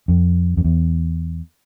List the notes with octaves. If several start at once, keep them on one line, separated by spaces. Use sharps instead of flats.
F2
F2
E2